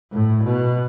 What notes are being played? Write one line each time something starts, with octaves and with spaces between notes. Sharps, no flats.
A2
B2